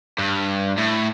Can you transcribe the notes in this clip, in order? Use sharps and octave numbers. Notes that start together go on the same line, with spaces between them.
G2
A2